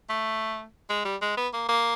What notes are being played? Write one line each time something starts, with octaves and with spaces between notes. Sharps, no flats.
A3
G#3
G3
G#3
B3
A#3
A#3